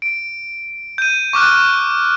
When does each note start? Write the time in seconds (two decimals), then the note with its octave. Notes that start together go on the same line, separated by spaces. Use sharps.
0.02 D7
0.98 G6 D#7
1.33 C#6 D6 F6 F#6